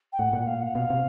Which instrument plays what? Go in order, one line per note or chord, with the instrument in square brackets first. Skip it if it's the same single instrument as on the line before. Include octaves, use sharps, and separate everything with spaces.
[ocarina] G5
[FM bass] A2 [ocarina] F#5
[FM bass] A#2
[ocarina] F5
F#5
[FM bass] B2 [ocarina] F5
[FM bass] C3